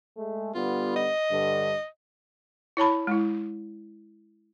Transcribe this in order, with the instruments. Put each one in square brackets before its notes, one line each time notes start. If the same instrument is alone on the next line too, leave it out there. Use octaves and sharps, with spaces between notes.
[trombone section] G#3 A3
[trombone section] D3 G3 B3 [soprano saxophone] F4
[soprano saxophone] D#5
[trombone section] G2 D3
[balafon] E4 C#5 A5 B5
G#3 E4